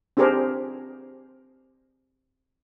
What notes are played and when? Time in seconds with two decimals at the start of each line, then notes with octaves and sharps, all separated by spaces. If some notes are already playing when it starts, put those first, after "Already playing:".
0.17 C4 D4 G4 G#4 A#4 C5